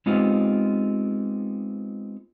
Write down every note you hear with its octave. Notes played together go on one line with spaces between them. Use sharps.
G#3 B3 C4 D#4 F4 G4